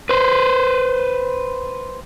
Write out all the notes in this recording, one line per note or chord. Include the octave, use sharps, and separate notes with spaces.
B4 C5